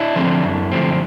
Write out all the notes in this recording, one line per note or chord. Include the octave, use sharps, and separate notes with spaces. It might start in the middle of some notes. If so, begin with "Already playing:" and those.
Already playing: D4 E4
D3 F3 A3 C4
F#2
D3 F3 A3 C4